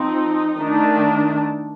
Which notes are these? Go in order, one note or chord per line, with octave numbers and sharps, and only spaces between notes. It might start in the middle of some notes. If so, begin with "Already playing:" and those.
Already playing: F3 C4 D#4
D#3 A3 D4